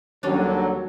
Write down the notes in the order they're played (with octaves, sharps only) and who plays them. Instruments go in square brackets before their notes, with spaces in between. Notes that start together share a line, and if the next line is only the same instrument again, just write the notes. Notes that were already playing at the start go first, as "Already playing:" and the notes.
[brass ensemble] D#2 D3 F#3 [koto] G3 C#4 D4